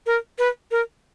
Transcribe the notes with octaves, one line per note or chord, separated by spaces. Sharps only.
A#4
B4
A#4